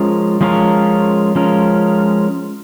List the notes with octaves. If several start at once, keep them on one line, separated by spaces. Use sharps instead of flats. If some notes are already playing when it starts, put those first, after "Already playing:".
Already playing: F3 G#3 C#4 F4 A#4
F3 G#3 C#4 F4 A#4
F3 G#3 C#4 F4 A#4